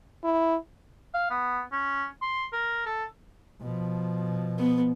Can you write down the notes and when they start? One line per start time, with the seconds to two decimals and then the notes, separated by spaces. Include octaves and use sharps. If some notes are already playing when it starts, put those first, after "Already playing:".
0.24 E4
1.14 F5
1.30 B3
1.72 C#4
2.22 C6
2.53 A#4
2.86 A4
3.61 B2 F3
4.59 B3